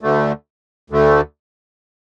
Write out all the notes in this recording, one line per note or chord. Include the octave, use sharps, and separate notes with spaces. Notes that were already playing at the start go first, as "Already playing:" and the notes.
D2 D3 A3
D2 D3 A3